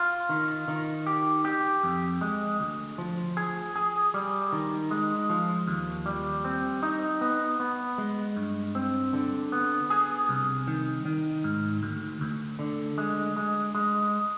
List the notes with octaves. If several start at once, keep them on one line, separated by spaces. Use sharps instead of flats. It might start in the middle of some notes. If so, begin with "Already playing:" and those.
Already playing: F4
D#3
D#3
G4
G4
F2
G#3
D2
F3
G#4
G#4
G3
D#3
G#3
F3
D#2
G3
C4
D#4
B3
B3
G#3
G2
C4
D3
B3
G#4
C2
D#3
D#3
G#2
D2
D2
D3
G#3
G#3
G#3